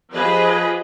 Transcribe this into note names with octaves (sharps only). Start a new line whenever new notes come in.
F3 G4 G#4 B4 D#5 B5